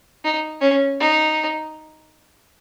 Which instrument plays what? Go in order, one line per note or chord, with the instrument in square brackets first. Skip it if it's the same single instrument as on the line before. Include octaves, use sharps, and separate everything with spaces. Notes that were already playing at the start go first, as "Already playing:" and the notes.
[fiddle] D#4
C#4
D#4